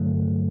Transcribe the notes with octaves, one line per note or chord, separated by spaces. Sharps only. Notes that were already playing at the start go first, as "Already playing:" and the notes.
Already playing: G2 D3 F#3 A3